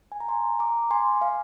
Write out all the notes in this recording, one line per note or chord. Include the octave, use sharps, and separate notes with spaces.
G#5
A#5
G#5 C6
A#5 D6
G#5 C6
F5 G#5